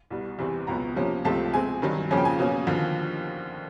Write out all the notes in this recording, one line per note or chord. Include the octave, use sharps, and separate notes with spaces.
C2 B2 G3
E2 C3 E3 G3 C4
C#2 B2 F#3 B3 A#5
C3 F3 A#3 C#4
C#2 C3 F3 A3 C4 A5
B2 G#3 C4 G#5
G2 D#3 F#3
F2 C#3 F3 A#3 C#4 G#5
G5
G#5
B2 F#3 A#3 C#4
D#2 D3 F3